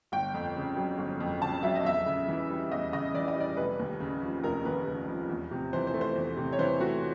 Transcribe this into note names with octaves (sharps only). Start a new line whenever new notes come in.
G1 G5
F2
C#3
F#3
G1
F2
C#3 A5
F#3 E5
D#5
E2 E5
C#3
E3
G3
E2 D#5
C#3 D#5
E3 D5
D#5
G3 D5
F1 B4
D#2
C#3
F3
F1 A#4
D#2 B4
C#3
F3
E2
C3
E3 C5
C5
A3
C5
E2
C3
C#5
E3 C5
A3 F#4